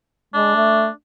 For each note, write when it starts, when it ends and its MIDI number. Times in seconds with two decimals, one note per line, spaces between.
0.34 0.51 56
0.34 0.90 62
0.55 0.87 57